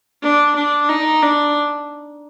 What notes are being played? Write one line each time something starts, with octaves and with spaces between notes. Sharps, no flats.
D4
D4
D#4
D4